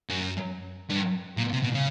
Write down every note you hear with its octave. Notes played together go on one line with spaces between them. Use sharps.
F#2
G2
A#2
C3
B2
C#3